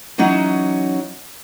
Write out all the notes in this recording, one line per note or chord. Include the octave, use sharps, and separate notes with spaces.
E3 F#3 C#4 D#4 F#4